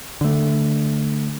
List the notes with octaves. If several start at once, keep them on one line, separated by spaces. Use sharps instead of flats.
D3 A3